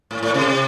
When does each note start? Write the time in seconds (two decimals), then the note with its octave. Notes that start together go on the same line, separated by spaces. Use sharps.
0.11 A2
0.23 A2
0.34 C3